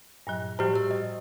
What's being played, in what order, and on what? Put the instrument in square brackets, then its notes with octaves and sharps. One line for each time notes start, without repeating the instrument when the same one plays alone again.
[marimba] G2 A#2 F#3
[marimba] A2 F3 G3 [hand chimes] G4 C5
[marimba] E6
[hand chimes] D#5